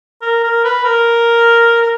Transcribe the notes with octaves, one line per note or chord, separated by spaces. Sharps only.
A#4
A#4
B4
A#4
A#4